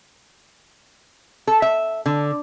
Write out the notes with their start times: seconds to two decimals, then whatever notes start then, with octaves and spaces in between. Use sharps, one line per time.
1.47 A4
1.62 E5
2.06 D3